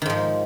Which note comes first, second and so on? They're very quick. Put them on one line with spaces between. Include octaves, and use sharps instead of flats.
D#3 G#2 F3